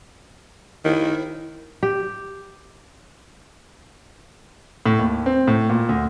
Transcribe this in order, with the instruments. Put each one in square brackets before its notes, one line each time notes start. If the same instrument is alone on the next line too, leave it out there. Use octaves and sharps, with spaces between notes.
[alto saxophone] D#3 [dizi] E4
[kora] G4
[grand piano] A2
D#2
C4
A2
A#2
D2